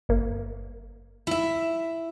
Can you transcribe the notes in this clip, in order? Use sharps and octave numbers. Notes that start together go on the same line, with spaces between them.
G1 A#3
E4 E5